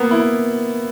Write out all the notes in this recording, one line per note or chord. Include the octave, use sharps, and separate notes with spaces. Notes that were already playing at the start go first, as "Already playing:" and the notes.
Already playing: A#3 B3
E4